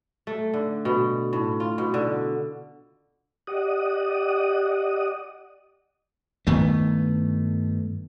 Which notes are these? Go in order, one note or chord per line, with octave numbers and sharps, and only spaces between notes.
A3
D3
B2
A2
F4
B2
D3
G4 D5 D#5 F#5 D#6
G2 D#3 A3 B3